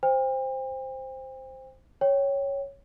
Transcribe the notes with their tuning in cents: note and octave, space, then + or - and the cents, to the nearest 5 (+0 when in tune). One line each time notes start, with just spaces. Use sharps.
C5 +0 G5 +40
C#5 +0 G5 +0